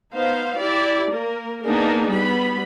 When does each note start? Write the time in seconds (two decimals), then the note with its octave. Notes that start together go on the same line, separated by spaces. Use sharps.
0.14 B3 D#4 C5 F5
0.57 E4 G4 D5
1.11 A#3 A#4
1.65 A#3 B3 D4 D#4 G#4 A#4
2.08 G3 B3 B5